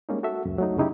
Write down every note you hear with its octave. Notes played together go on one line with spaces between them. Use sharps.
G3 G#3 A#3 C#4 D#4
F#4 A4 E5
C#2 F#2
F#3 A3 D#4
F#2 C#3 D#4 E4 G4